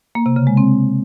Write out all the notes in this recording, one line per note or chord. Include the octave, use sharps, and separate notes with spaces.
A#3
C3
C#3
G#3
C4